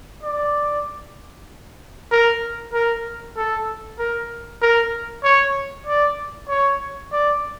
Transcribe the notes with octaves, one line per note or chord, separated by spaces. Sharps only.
D5
A#4
A#4
A4
A#4
A#4
C#5
D5
C#5
D5